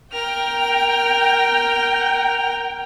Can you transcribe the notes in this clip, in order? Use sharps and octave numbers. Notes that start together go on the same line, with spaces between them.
A#4 G5 F6